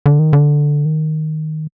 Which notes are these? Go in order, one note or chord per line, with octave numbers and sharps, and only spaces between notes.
D3
D#3
D3
D#3